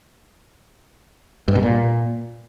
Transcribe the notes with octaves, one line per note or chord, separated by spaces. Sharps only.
G2
B2
A#2